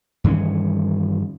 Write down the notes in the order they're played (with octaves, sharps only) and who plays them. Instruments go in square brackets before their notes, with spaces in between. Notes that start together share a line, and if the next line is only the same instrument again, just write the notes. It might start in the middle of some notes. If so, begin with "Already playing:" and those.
[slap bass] G2 D#3 E3 C#4